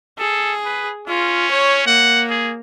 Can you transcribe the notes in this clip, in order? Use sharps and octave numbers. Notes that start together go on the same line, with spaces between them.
G#4 A4
B4
C#4 F4
C#5
A#3 F#5
G#4